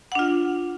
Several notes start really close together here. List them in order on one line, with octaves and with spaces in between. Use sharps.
F#5 D4 F4